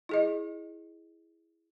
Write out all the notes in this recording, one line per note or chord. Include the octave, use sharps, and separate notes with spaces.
E4 G#4 D#5